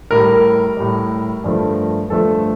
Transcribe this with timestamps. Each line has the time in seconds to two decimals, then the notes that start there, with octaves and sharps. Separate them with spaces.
0.11 A2 G3 A#4
0.77 A2 G3
1.44 G2 F3 A3
2.10 G2 F3 A3 A4